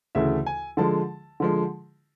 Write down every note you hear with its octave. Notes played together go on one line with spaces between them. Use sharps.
D2 C#3 E3 A3 E5
G#5
D3 F3 G#3 A5
D3 F3 G#3